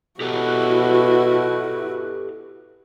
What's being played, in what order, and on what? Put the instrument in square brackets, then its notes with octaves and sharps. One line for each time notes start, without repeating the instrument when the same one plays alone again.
[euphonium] B2 [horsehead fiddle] E4 F#4 [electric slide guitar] G4 A4 B4